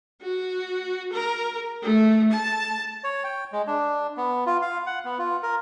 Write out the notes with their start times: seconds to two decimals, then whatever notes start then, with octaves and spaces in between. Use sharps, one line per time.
0.22 F#4
1.13 A#4
1.82 A3
2.32 A5
3.04 C#5
3.24 G5
3.52 G#3
3.67 D4
4.17 B3
4.46 F4
4.62 F5
4.86 F#5
5.05 B3
5.18 F4
5.43 A#4